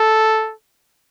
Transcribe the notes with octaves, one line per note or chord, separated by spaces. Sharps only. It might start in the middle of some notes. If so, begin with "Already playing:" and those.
Already playing: A4